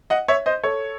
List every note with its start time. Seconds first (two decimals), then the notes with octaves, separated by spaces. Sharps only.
0.10 D#5 F#5
0.28 C#5 E5
0.46 C5 D#5
0.63 A4 C#5